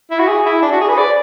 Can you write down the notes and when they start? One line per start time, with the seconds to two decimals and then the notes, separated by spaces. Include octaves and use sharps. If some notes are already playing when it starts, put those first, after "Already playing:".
0.11 E4
0.19 F#4
0.28 G#4
0.46 E4
0.62 D4
0.72 F#4
0.81 G#4
0.88 B4
0.98 D5